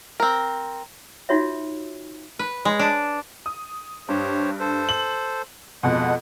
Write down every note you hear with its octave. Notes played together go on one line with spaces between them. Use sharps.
C4 A#4
D#4 F4 F#4 C#5 E5
B4
G#3
D4
D#6
G2 G4 C5 C#5
A4 C5
F#7
F2 B2 G#3 F#5